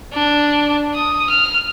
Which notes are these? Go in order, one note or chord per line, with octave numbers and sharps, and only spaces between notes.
D4
D#6
F6